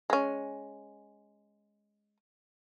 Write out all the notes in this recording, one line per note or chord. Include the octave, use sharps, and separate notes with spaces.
G#3 C#4